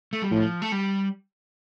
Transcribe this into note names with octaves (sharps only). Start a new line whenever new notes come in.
A3
G3
A2 F3
A3
G3